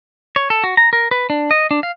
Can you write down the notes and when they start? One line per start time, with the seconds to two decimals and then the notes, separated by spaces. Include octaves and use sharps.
0.36 C#5
0.50 A4
0.64 F#4
0.77 A#5
0.93 A#4
1.11 B4
1.30 D4
1.51 D#5
1.71 D4
1.83 F5